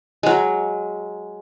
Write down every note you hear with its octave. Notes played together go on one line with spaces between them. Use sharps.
F#3 G#3